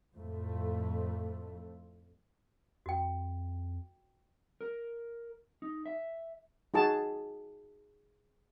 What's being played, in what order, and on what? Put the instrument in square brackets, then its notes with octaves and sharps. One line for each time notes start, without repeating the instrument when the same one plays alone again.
[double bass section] F2 A2 F3 A3
[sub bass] F2 [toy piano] F#4 G5
[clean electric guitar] A#4
D#4
E5
[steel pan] D#4 F#4 G#4 A5